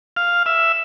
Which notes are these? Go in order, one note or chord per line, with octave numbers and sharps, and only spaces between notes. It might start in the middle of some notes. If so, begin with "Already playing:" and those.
F5
E5